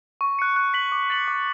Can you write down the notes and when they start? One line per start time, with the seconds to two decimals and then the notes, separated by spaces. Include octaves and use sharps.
0.21 C#6
0.39 F#6 C#7
0.56 F#6
0.74 B6 F#7
0.92 D6
1.10 A6 C#7 F#7
1.28 D6